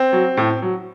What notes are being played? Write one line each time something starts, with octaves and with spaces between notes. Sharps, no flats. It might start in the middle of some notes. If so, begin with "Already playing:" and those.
Already playing: C4
F#3
A2
F#3